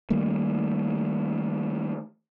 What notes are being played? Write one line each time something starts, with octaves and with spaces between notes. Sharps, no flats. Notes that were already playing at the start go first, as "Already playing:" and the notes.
D#3 G3 A3 A#3